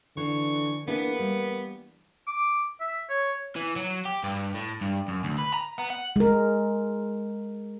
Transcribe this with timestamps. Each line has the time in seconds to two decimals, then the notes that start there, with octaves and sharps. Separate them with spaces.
0.17 D3 E3 C#6
0.88 A#3 B3 D4 E4 G#4
1.20 G3
2.27 D6
2.81 E5
3.10 C#5
3.56 E3
3.76 F#3
4.05 G4
4.23 G2
4.54 A2
4.81 G2
5.08 F#2
5.24 D2
5.38 B4
5.54 A#5
5.78 B3
5.90 F#5
6.16 G#3 A#4